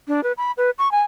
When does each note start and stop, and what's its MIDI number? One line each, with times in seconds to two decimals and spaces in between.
0.08 0.23 62
0.23 0.32 71
0.37 0.51 83
0.57 0.70 71
0.78 0.91 85
0.91 1.01 80